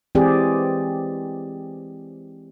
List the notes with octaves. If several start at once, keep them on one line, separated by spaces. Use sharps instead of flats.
E3 G#3 C4 G4 G#4 D5